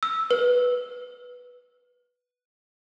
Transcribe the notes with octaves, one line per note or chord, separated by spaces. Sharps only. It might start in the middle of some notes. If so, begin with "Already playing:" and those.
E6
B4